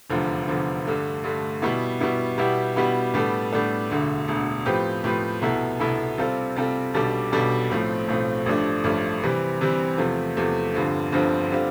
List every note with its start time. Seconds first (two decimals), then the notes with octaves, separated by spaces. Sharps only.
0.10 F1 E2 D3 F3
0.48 F1 E2 D3 F3
0.85 G2 D3 A3
1.24 G2 D3 A3
1.62 B2 G3 B3 E4
2.00 B2 G3 B3 E4
2.38 B2 G3 B3 E4 G4
2.76 B2 G3 B3 E4 G4
3.14 A2 G3 B3 D4 A4
3.52 A2 G3 B3 D4 A4
3.90 E1 D2 D3
4.28 E1 D2 D3
4.65 A2 F3 C4 G4 B4
5.04 A2 F3 C4 G4 B4
5.42 C2 B2 B3 E4 A4
5.79 C2 B2 B3 E4 A4
6.18 C3 G3 C4 F4 A4
6.56 C3 G3 C4 F4 A4
6.94 B1 B2 G3 D4 A4
7.32 B1 B2 G3 D4 A4
7.70 B1 A2 F3 A3 C4
8.08 B1 A2 F3 A3 C4
8.46 A1 G2 F3 A3 D4
8.84 A1 G2 F3 A3 D4
9.23 C3 E3 G3 C4
9.61 C3 E3 G3 C4
9.98 E2 C3 F3 A3
10.37 E2 C3 F3 A3
10.74 G1 G2 D3 F3 C4
11.12 G1 G2 D3 F3 C4
11.50 D3 G3 C4 F4